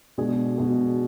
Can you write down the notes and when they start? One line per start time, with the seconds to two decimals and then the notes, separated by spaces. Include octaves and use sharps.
0.18 B2 G#3 D4 G#4
0.58 B2 G#3 D4 G#4